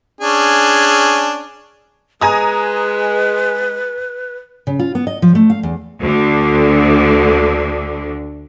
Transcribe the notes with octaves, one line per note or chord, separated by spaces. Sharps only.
C#4 D4 G#4
G#3 B4 G#5 A#5 D#6
C#3
F4
B3
D#5
F3
A3
F5
E2
D2 D3